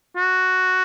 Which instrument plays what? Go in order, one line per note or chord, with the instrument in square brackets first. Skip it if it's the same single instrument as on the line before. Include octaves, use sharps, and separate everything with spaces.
[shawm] F#4